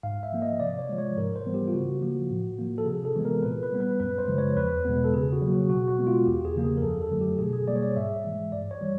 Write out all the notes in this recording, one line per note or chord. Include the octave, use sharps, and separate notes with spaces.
G#2 F5
E5
F3 A#3
D#5
C3 D5
C#5
F3 G#3
C#5
G#2 A#4
C5
E3 G3 B3
G4
F4
C#3 F#4
F3 A#3
A2
F3 A#3
A4
C3 G#4
A4
E3 G#3 B3
A#4
A#2 B4
B4
G3 B3
B4
F#2 B4
C5
C#3 F3 G#3
C#5
E2 B4
B2 G#3 B3
A4
C#3 G#4
F#4
F#3 A#3
F#4
B2 F#4
F#4
G#3 B3
F4
E2 G4
G#4
C#3 F3 A#3
G#4
A#4
F#2 A4
A4
D3 F#3 A3
G4
B2 G#4
G#4
G3 A#3 D5
C#5
D5
G#2 E5
E3 G#3
G2 D5
C#5
E3 G3